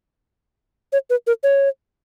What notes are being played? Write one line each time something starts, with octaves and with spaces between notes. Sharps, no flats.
C#5
B4
A#4
C#5